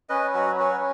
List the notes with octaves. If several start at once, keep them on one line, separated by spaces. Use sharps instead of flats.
C#4 B4 D#5
F#3 F#4 B4
C#4 F#4 B4